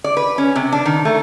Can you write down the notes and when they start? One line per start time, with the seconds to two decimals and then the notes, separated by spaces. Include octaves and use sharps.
0.04 D5
0.17 B4
0.38 C#4
0.56 C3
0.72 D4
0.85 D#3
1.05 A3